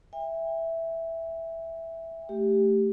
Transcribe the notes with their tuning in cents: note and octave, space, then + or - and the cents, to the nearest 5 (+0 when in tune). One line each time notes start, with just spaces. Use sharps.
E5 +0 G5 +45
A3 +0 G4 +0